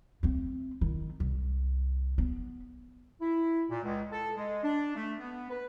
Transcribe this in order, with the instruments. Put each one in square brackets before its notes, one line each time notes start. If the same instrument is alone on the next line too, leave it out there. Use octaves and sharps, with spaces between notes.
[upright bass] A3 C4
D#3 E4
C2
B3
[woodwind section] E4
A#2
C#2
A4
G#3
D4
A3
B3
B4